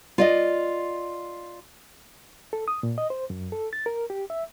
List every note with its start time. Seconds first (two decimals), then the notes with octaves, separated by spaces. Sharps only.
0.18 F4 D5 D#5
2.53 A4
2.68 D#6
2.83 A#2
2.98 D#5
3.10 C5
3.30 F#2
3.52 A4
3.73 A6
3.86 A#4
4.10 G4
4.30 E5